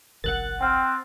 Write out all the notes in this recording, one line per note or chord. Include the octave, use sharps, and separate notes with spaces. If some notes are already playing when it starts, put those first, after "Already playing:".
G1 C2 F2 A#4 F#5 F#6 A6
C4 G5 F6